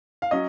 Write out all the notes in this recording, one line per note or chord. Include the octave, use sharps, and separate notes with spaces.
F5
F#3 C#4 D#5